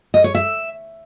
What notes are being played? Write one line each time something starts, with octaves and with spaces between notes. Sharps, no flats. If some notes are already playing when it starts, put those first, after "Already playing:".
D#5
C#5
E5